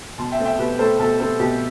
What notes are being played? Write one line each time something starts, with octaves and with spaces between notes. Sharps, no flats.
B2 A5 C6
E5 G5
A3 C4
E5 G5
B2 G4 B4
A3 C4 A4 C5
B2 A4
A3 C4 A4
B2 G4